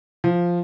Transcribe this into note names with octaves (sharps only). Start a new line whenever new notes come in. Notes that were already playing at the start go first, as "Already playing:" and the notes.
F3